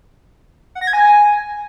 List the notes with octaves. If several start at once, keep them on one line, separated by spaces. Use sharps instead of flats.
F#5
A#6
G#6
G#5